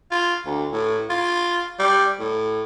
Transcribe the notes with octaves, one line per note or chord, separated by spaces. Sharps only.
F4
D2
A2
F4
G3
A2